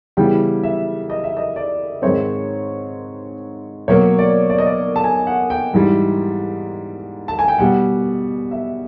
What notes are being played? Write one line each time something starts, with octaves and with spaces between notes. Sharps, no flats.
C#3 E3 G3 B3 G5
E5
D#5
E5
D#5
D5
G#2 D#3 G#3 C4 C#5
B2 F#3 A#3 C#5
D5
D5
D#5
D5
A5
G#5
F#5
G5
G#2 E3 G3
A5
G#5
G5
B2 G3 B3 F#5
E5